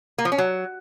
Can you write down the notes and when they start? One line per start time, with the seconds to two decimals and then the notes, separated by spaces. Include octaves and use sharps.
0.18 A#3
0.25 F3
0.32 C#4
0.38 F#3